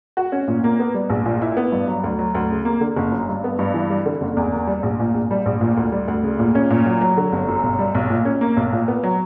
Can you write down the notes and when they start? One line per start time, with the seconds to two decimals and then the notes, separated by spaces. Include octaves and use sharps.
0.17 F#4
0.32 C#4
0.48 A#2
0.64 A#3
0.80 B3
0.94 G3
1.10 A#1
1.25 A#2
1.42 E4
1.57 B3
1.72 G2
1.88 F#3
2.04 D2
2.19 F#3
2.35 D2
2.50 C#3
2.65 A#3
2.81 D3
2.96 F#1
3.12 F#2
3.28 G2
3.44 B3
3.59 G2
3.74 E3
3.90 G3
4.06 D3
4.21 F#1
4.37 E2
4.52 A#3
4.67 G3
4.83 A#1
5.00 A#2
5.14 A#1
5.31 G3
5.46 A#1
5.61 A#2
5.77 D2
5.92 G3
6.08 D2
6.23 C#3
6.39 A#2
6.55 C#4
6.70 A#2
6.86 F#3
7.01 F#3
7.17 D3
7.32 G1
7.48 F#2
7.63 B1
7.79 G3
7.95 B1
8.10 A#2
8.25 C#4
8.41 A#3
8.57 B1
8.73 A#2
8.88 B3
9.03 F#3